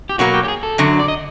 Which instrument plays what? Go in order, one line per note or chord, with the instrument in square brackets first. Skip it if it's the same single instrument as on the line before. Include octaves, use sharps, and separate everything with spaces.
[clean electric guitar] G4
[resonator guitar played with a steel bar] B2 F#3 A#3 [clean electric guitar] F#4
[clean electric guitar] G4
G4
G#4
A4
[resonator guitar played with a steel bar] F#2 D3 F#3
[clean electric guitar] D5
D#5